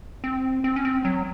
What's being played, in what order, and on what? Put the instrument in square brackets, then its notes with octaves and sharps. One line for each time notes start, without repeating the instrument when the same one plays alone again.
[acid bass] C4
C4
C#4
C4
F#3